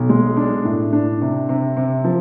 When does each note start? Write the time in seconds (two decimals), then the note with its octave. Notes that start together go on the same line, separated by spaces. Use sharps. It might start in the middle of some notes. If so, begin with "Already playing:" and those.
Already playing: B1
0.09 G#3
0.37 D4
0.65 A2
0.93 D4
1.21 C3
1.49 C3
1.77 C3
2.04 F3